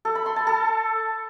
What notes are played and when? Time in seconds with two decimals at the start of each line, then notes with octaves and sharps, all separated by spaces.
0.05 A4
0.15 B5
0.26 C6
0.36 A5
0.47 A4